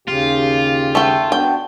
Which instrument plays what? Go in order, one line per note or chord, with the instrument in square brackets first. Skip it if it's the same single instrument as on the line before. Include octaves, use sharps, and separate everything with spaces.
[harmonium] D#2 C#3 G4 [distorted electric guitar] F4
[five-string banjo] A3 G5
[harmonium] B3 D4 F#4 [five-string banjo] G5